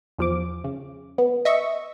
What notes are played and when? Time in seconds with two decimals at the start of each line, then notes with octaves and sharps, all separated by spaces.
0.19 E2 F3 D6
0.64 C#3
1.18 B3
1.45 D#5 E5 C#6